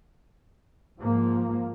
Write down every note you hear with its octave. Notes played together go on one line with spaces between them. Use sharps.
G#2 F3 A#3